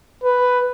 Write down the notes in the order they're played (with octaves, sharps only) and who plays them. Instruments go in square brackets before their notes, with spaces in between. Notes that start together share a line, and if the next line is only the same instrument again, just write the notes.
[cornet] B4